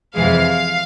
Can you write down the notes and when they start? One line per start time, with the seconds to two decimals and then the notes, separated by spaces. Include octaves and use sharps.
0.14 F2 C3 E3 G#3 F5